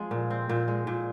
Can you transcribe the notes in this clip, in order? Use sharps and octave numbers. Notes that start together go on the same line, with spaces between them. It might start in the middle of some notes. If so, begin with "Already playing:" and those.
Already playing: F3 G#3 C4
A#2
C4
A#2
G#3
A#2